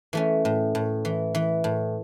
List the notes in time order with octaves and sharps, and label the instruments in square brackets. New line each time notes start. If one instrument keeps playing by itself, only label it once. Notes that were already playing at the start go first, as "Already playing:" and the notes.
[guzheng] E3 A3 C#4
A2
A2
E3
E3
A2